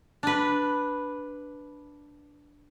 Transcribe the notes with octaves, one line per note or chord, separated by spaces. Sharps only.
D4 B4